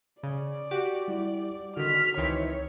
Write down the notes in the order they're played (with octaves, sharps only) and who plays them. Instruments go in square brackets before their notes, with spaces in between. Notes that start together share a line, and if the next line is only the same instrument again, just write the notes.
[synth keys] C#3 [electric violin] D5
[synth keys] F#4 G4 D6
[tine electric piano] G3 E4
[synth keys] D3 D#3 [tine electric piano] F#4 [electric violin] F6 B6
[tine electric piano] C#2 [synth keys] D#3 E3 C4 [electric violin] C#5